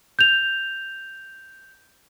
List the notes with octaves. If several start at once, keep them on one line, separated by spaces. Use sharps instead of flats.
G6 F7